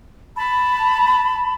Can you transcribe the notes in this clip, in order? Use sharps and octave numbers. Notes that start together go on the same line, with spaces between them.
A5 B5